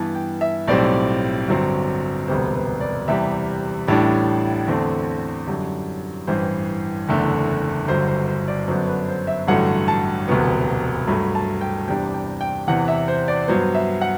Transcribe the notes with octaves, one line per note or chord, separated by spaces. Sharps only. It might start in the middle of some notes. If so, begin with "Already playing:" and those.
Already playing: G2 E3 B3 A5
G5
E5
B1 A2 G3 C4 D5
G1 G2 F#3 C4
E1 D2 C3 G3 B3 C5
B4
D5
E2 C3 G3 E5
A1 A2 G3 D4
E2 D3 A3 C4
F#2 D3 G3
A1 G2 E3 C5
F#1 E2 D3 A3
G1 G2 D3 F#3 C5
C5
C5
D5
F#2 D3 F#3 B3 D4 C5
B4
C5
E5
A1 G2 D3 F#3 A3 F#5
A5
E1 D2 C3 F#3 B3
G2 F#3 A3 B5
A5
G5
E2 C3 G3 D4 G5
G5
G5
E2 C3 E3 F#5
E5
C5
D5
G2 F#3 B3 C5
E5
F#5